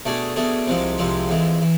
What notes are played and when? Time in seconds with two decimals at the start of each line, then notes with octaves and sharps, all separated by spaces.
0.06 B2 A3 D4 G#4
0.36 B2 A3 D4 G#4
0.68 C2 C3 F3 G#3
0.98 C2 C3 F3 G#3
1.29 F2 E3 G#3
1.62 E3